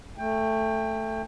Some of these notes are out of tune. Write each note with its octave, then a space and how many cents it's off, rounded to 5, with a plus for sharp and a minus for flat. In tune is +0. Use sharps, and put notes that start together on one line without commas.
A3 +5 G5 +25